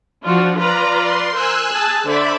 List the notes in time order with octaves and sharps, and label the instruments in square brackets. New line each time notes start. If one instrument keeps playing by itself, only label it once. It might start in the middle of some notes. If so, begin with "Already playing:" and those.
[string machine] F3 [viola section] D4 F4 F#4
[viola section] F4 B4 D5 [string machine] A#5
[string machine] C6
[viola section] A#4 C5 [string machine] G#5 E6 F#6
[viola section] G#4 A5
[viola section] D3 C5 D5 [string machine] E5 B5